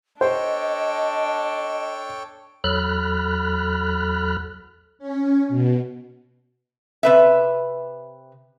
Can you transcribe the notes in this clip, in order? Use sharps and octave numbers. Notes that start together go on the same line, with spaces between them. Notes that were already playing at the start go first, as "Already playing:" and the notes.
D4 A4 C5 C#5 D#5 G5
E2 F#3 A4 B5 F6 F#6
C#4
B2
C3 B4 E5